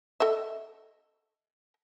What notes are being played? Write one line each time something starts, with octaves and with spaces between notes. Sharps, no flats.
A4 D#5 E5